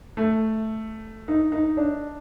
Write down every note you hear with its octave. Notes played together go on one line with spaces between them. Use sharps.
A3
D#4
D#4
D4